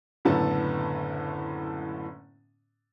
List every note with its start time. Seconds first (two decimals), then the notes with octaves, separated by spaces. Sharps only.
0.25 F#1 A2 D3 B3 A4 A5